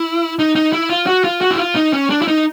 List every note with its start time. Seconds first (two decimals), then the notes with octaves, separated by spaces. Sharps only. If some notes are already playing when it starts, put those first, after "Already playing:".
Already playing: E4
0.39 D#4
0.55 D#4
0.73 E4
0.89 F4
1.07 F#4
1.24 F4
1.41 F#4
1.51 E4
1.58 F4
1.75 D#4
1.93 C#4
2.10 D4
2.22 E4
2.28 D#4